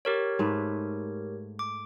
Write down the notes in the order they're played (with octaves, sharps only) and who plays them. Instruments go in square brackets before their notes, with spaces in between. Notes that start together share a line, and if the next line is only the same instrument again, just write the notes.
[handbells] G4 A#4 C#5
[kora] G#2 A3 B4
[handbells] D6